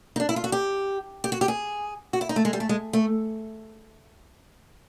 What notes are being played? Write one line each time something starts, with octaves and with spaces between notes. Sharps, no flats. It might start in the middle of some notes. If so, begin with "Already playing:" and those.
D#4
D4
E4
F4
F#4
G4
G4
F#4
G4
G#4
F#4
E4
D#4
A3
G#3
G3
A3
G#3
A3